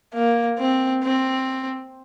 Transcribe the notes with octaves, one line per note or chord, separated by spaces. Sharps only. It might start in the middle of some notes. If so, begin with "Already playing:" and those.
A#3
C4
C4